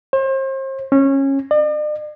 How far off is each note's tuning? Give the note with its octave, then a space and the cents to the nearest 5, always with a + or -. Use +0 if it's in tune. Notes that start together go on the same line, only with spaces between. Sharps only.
C5 +40
C#4 -20
D5 +45